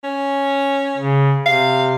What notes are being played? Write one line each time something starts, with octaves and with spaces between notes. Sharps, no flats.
C#4
C#3
C3 F5